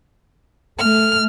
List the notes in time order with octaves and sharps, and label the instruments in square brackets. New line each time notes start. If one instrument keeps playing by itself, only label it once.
[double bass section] A3 [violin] F6